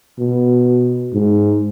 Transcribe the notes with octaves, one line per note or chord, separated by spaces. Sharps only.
B2
G#2